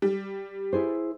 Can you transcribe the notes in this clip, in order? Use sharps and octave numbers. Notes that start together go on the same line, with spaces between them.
G3
E4 G#4 C5